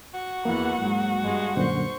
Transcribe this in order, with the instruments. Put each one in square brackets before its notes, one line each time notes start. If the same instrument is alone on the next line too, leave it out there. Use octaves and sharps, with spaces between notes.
[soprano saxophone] F#4 [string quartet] C#6
[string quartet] E2 E3 F#5 [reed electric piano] A#3
[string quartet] G#2 F#3
G2 G#3
[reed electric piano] F#2 A#2 D3 [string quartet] C5 C#6